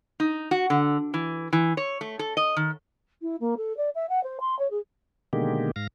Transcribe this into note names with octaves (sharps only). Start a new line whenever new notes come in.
D#4
F#4
D3
E3
E3
C#5
A3
A4
D#5
D#3
E4
A#3
A4
D5
E5
F#5
C5
C6
C#5
G#4
B2 D3 D#3 G#3 A#3 G4
G#2 F5 A#6